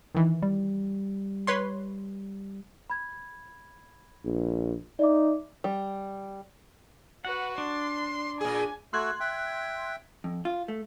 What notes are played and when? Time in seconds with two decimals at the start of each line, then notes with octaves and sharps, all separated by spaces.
0.15 D#3 E3
0.42 G3
1.47 B4 C#5 C6
2.90 B5 G#6
4.25 A#1
4.99 D#4 D5 E5 D6
5.64 G3
7.25 F#4 B4 F#5
7.58 D4 C6
8.41 A#2 G#4 G#5
8.93 A3 F#4 C6 E6 F#6 G#6
9.20 E5 G5
10.24 F2
10.45 F4
10.68 A3